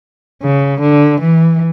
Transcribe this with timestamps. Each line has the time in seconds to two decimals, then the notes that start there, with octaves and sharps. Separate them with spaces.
0.43 C#3
0.81 D3
1.20 E3